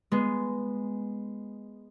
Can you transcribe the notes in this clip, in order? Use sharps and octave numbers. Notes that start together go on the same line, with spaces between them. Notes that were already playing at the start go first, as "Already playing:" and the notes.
G#3 B3